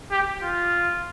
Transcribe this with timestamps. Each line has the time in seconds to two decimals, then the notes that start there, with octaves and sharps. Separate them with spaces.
0.11 G4
0.43 F4